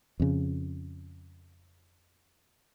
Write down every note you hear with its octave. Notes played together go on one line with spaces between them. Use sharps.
F2 C#3